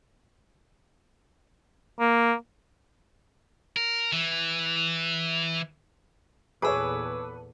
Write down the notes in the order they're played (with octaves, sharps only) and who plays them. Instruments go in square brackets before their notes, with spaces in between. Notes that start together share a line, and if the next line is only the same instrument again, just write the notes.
[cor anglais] A#3
[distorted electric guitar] A#4
E3
[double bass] E2 A#2 [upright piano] G#4 C#5 [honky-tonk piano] A4 B4 [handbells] D6 E6